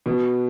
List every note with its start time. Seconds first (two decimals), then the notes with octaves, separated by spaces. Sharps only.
0.06 B2